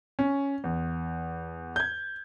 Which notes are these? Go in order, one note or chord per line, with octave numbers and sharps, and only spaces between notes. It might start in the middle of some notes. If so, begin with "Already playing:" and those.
C#4
E2
G6 G#6